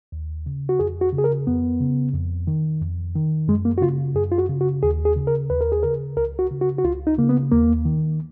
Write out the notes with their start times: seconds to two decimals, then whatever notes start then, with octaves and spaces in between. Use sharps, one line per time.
0.12 D#2
0.46 C#3
0.69 F#4
0.79 F2 G#4
1.01 F#4
1.13 C#3
1.18 G#4
1.24 A#4
1.47 F2 B3
1.80 C#3
2.14 F2
2.47 D#3
2.81 F2
3.15 D#3
3.48 F#2 G#3
3.65 A#3
3.78 F#4
3.81 C#3 F4
4.15 F#2 G#4
4.32 F4
4.38 F#4
4.49 C#3
4.61 F#4
4.83 D#2 G#4
5.05 G#4
5.16 C#3
5.27 A#4
5.50 D#2 B4
5.61 A#4
5.72 G#4
5.83 C#3 A#4
6.17 C#2 A#4
6.39 F#4
6.51 C#3
6.61 F#4
6.78 F#4
6.84 C#2 F4
7.07 D#4
7.18 C#3 A#3
7.29 B3
7.52 D#2 A#3
7.85 D#3